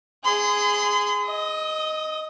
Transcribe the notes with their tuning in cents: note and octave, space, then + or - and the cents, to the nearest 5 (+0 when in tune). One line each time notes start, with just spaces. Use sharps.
G#4 +0 C6 -40
D#5 +0 D#6 +40